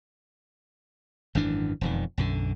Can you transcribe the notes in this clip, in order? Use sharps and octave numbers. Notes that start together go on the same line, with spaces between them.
G#1 F#2 E3 D4
E1 F2 D#3
B1 F#2 D3